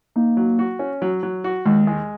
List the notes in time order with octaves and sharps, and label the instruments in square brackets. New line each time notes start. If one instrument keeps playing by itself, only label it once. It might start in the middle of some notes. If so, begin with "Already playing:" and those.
[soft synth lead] A#3 [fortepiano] D#4
[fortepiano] F#3
F#4
C#4
F#3
F#3
F#4
[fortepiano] D#2 [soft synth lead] G#3
[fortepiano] G#3